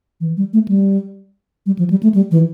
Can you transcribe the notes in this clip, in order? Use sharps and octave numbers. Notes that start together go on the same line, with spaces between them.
E3
G3
A3
G3
G3
F3
G3
A3
G3
E3